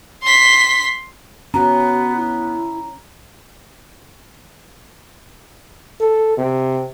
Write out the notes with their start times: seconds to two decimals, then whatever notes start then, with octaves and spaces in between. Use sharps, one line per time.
0.23 C6 B6
1.54 B3 C#4 F#4 A#5
2.16 E4
6.00 A4
6.38 C3